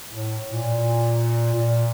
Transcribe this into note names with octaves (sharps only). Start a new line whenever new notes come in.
A2
A#2
A#2